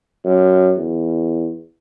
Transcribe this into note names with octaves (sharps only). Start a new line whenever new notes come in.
F#2
E2